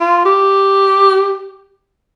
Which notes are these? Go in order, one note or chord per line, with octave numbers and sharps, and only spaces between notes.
F4
G4